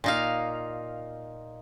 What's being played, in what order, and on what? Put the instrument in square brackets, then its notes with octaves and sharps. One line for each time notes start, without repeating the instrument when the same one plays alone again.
[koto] A#2 D#4 F5